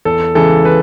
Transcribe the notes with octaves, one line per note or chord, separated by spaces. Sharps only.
E2 A4
C#3 E3 G#3 A4
B4